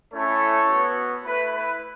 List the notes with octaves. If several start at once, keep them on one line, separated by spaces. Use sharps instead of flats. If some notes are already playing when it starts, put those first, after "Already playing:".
A3 C#4 E4 A4 C#5
B3 F#4
A3 E4 B4
B4